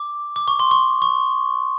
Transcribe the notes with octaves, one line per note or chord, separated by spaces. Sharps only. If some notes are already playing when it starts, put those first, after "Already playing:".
Already playing: D6
D6
C#6
C6
C#6
C#6